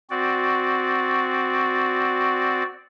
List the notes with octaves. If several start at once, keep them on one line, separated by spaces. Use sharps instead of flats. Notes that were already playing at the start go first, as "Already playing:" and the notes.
C4 F#4 D5